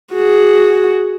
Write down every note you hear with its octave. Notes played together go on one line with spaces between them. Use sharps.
F#4 G#4